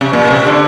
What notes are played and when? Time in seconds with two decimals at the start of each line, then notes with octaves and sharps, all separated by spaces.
0.01 C3
0.13 A#2
0.31 C3
0.46 D3